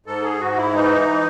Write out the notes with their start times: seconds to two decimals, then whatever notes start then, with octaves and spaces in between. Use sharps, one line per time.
0.06 G#2 A4
0.23 G#4
0.40 G#2 F#4
0.57 E4
0.73 E3 D#4